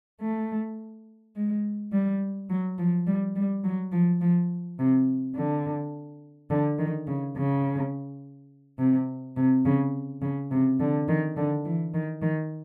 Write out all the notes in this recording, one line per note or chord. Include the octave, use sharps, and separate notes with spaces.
A3
G#3
G3
F#3
F3
G3
G3
F#3
F3
F3
C3
D3
D3
D#3
C#3
C#3
C3
C3
C#3
C#3
C3
D3
D#3
D3
E3
D#3
D#3